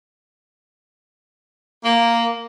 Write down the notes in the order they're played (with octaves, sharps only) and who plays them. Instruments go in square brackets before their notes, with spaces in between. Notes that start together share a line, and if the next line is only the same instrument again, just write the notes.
[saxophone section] A#3